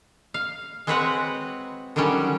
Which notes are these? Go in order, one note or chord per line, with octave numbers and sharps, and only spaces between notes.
F5
G#3 C4 F#4 B4 C#5 F#5
D3 D#3 F#3 G3 C#4